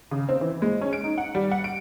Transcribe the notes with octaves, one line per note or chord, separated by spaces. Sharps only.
C#3
C4
E3
G#3
C#4
D7
D#4
F#5
G3
F#5
D7